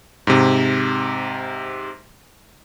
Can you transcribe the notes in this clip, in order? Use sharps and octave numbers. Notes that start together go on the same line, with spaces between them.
G#2 C3